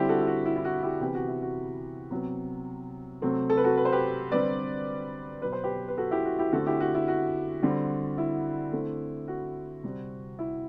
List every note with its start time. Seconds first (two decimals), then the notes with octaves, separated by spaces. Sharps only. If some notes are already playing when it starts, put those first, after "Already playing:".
Already playing: D3 G3 C4 E4 G4
0.09 F#4 A4
0.21 E4
0.27 F#4
0.46 E4
0.56 E4
0.65 F#4
0.83 E4 G4
1.01 C3 E3 B3 G4
1.15 F#4
1.28 E4
1.42 F#4
2.11 C3 F#3 B3
3.22 C3 F#3 A3 C4
3.50 A4
3.57 B4
3.64 F#4 A4
3.77 B4
3.85 C5
3.92 G4 B4
4.32 D3 G3 C4 B4 D5
5.42 B2 F#3 B3 B4
5.52 C5
5.64 G4 B4
5.88 B4
5.97 F#4 A4
6.11 E4 G4
6.25 F#4
6.39 E4 G4
6.52 D3 A3 C4 F#4 A4
6.66 E4 G4
6.80 F#4
6.95 E4
7.08 F#4
7.62 D3 G3 C4
8.18 E4
8.73 D3 A3 C4
9.28 F#4
9.84 C3 G3 C4
10.39 E4